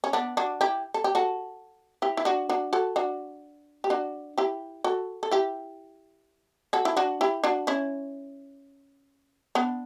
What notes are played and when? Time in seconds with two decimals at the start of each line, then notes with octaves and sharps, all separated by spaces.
0.04 C#4
0.13 B3 D4
0.37 D4 F#4
0.61 E4 G4
0.94 A4
1.04 G4
1.15 F#4 A4
2.02 E4 G4
2.17 E4
2.25 D4 F#4
2.49 D4 F#4
2.73 F#4 A4
2.96 D4 F#4
3.84 G4
3.90 D4 F#4
4.38 E4 G4
4.84 F#4 A4
5.23 A4
5.31 E4 G4
6.73 F#4 A4
6.85 E4
6.97 D4 F#4
7.21 E4 G4
7.44 D4 F#4
7.67 C#4 E4
9.55 B3 D4